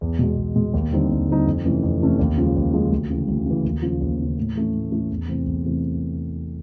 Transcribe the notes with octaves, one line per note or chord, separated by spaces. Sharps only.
E2
B2 G#3
E2
B2 G#3
D#2
D3 G3 C4 D#4
D#2
D3 G3 C4 D#4
F2
C3 E3 A3 C#4
F2
C3 E3 A3 C#4
D#2
C#3 F3 G#3
D#2
C#3 F3 G#3
D2
C#3 E3
D2
C#3 E3
D#2
C#3 F3
D#2
C#3 F3
A2
E3 A3 C#4
A2
E3 A3 C#4
E2
C3 E3 A3 C4
E2
C3 E3 A3 C4